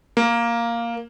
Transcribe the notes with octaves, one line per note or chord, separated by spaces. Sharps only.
A#3